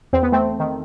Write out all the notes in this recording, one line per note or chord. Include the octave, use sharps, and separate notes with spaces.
E2 C4
B3
A3 C4
D#3